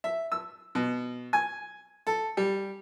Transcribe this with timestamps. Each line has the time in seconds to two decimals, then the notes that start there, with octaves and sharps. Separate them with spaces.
0.04 E5
0.32 E6
0.75 B2
1.33 G#5
2.07 A4
2.37 G3